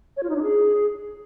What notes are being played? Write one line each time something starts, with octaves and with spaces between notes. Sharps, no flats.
C#5
F4
D#4
D4
G#4